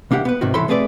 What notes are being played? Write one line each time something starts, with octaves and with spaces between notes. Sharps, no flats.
C2 A#3 D4 G4 F#5
B3 B4
G#2 C3 D#3 F#4
C2 E3 A4 C#5 B5 C6
A3 C4 G#4 B4 C#5 D5